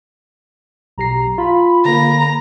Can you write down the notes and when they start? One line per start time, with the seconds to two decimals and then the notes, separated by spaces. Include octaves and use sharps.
0.98 B1 G4 A#5 C7
1.38 F4 B5
1.85 D3 A#3 A#5